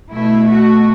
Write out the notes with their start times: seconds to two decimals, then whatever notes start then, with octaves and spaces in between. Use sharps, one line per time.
0.12 B2 A3 E4
0.50 F#4